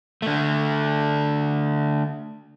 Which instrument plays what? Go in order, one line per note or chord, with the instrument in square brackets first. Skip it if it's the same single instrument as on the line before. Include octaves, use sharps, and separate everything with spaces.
[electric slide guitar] D3 A3